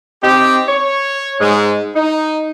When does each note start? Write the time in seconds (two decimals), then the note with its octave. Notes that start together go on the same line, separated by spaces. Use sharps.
0.23 C4 D#4 G4
0.69 C#5
1.40 G#2 G#3
1.96 D#4